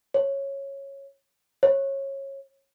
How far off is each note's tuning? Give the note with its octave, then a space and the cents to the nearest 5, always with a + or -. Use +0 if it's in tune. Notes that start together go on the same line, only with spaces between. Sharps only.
C#5 -10
C#5 -20